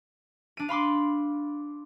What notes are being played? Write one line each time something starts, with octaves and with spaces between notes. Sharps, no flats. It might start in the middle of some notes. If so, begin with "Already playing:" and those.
D4 D#7
F5 B5 C6 D6